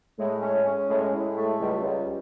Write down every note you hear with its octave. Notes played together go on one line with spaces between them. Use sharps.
A2 G#3
C#4
C#4
A2 G#3
A2
A3
C#2 G3
C#2